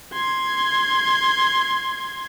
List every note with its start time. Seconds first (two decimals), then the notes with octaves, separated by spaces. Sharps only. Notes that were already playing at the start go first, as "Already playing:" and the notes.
0.13 C6 G#6